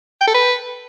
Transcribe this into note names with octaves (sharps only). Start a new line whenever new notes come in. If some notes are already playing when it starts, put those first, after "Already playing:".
G5
A4
B4